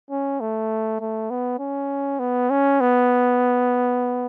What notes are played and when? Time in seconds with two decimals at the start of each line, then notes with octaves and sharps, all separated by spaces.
0.10 C#4
0.41 A3
1.01 A3
1.30 B3
1.59 C#4
2.20 B3
2.50 C#4
2.81 B3